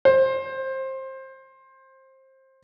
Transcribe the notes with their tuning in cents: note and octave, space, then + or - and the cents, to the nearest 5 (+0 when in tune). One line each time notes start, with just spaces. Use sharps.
C5 +20